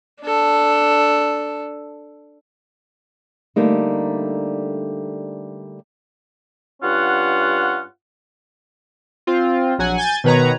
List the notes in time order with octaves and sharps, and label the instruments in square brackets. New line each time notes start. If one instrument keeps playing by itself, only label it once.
[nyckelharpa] D4 A4
[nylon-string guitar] D3 G3 A3 A#3 D#4
[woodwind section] G2 C#4 F4 F#5
[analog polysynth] C4 F4
A#1 F#3 F#5 G#5
G#5 G6 A6
B2 D#3 B4 C#5 A#5